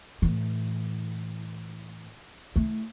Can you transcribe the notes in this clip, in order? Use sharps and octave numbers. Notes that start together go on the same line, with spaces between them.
A2 E3
A3 E4